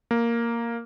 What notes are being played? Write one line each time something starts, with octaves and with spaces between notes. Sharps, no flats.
A#3